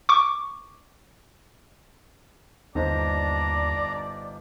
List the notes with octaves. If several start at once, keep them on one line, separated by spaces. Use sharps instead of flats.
C#6 D6
G1 D#2 D4 D#4 C5 D5 A#5